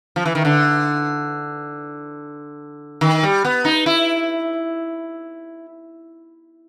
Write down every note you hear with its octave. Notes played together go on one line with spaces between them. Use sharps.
F3
E3
D#3
D3
D#3
G3
B3
D#4
E4